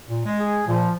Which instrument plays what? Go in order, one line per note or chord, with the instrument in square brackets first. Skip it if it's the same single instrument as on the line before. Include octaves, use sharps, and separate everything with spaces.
[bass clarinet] A#2
G#3
[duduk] G#4
[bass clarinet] A#2 [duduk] F3